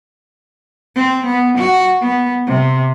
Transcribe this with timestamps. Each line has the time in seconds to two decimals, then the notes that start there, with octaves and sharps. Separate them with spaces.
0.96 C4
1.26 B3
1.58 F#4
2.01 B3
2.47 C3